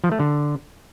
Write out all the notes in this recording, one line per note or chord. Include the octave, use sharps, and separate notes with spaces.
F3
A3
D3